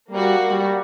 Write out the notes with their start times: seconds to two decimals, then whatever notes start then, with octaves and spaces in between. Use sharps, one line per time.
0.11 G3 A#3 F#4
0.50 G3